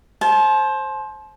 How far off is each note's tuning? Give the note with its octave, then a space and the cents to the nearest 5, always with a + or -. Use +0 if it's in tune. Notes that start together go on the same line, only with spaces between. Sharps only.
C5 +20 A5 -40